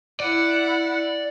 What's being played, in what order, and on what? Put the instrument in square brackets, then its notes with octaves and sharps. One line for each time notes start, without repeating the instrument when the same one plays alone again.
[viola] E4 F#5 [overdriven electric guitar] D5